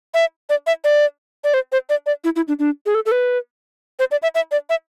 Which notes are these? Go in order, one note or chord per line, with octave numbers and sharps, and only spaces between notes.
E5
D5
E5
D5
D5
C5
C5
D5
D5
E4
E4
D4
D4
G#4
A4
A4
B4
C5
D5
E5
E5
D5
E5